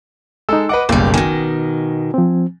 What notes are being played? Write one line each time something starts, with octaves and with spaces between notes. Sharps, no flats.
G#3 D#4 A4 E6
B4 D#5 F#5 D6
F#1 B1 A#2 G3 A#3
B2 D#3 G#5
F3 C4